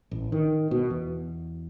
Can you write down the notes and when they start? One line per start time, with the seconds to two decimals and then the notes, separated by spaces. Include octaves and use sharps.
0.11 A1
0.32 D#3
0.71 B2
0.90 E2